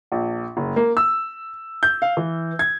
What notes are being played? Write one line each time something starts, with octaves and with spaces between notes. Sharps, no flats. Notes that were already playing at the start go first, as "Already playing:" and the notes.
A#1
F#1
A#3
E6
G6
F5
E3
G#6